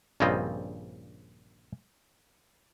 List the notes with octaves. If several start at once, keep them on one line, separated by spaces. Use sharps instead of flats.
A#1 G2 C#3 C4 F4 D#5